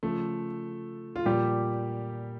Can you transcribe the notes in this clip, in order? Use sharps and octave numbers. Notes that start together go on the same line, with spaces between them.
C#3 F3 A3 A4
F4
A#2 F3 G3 G4